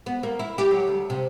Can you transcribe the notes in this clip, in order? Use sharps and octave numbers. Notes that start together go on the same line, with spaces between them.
B3
A#3
E4
G4
F#3
D2
C3